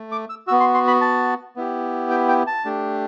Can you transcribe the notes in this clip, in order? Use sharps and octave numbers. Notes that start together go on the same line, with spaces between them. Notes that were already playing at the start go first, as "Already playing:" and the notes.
Already playing: A3
D6
E6
B3 F#4 E6
C6
C6
B5
A5
B3 E4 G4
G5
G5
A5
A3 D4 G4